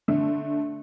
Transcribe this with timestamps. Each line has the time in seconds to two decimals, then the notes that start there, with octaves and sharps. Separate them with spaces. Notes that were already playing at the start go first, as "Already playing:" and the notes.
0.08 D3 A3